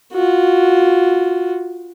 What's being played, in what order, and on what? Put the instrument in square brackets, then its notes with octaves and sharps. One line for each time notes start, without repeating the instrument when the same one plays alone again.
[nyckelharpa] F4 F#4